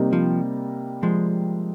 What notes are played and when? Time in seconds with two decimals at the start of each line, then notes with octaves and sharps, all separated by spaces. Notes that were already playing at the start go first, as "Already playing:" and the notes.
Already playing: C3 G3 A#3 D#4
0.13 F3
1.03 F3 G#3